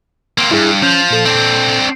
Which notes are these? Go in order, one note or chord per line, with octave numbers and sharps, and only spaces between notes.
A#3 C4
G2 E4 G#4
F3 C#4 G6
A#2 A4
C4 D4